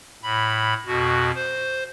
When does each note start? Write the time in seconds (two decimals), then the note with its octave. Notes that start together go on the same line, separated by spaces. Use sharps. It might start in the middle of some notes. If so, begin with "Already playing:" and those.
0.23 A2 B5
0.86 F2 B2 F#4
1.35 C5